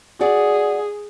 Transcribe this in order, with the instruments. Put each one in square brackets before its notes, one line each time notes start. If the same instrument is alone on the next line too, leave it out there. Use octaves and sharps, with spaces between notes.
[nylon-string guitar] F#4 D5 F#5 [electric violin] G#4